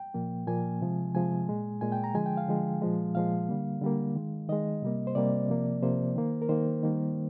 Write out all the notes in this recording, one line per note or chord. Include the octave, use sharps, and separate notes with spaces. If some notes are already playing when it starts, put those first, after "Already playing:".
Already playing: G5
A#2 F3 A#3
A#2 F3 A#3 G#5
C3 F3 G#3
C3 F3 G#3 G#5
A#2 G#3
A#2 G#3 G#5
G5
A#5
D3 F3 G#3 G#5
G5
F5
D3 F3 G#3
A#2 F3 G#3
A#2 F3 G#3 F5
D3 G3 A#3
D3 G3 A#3
D#3 G#3
D#3 G#3 D#5
C3 G3 A#3
C5
C3 G3 A#3 D5
C3 F3 A#3
C3 F3 A#3 C5
D#3 A#3
A#4
D#3 A#3 C5
D#3 G3 A#3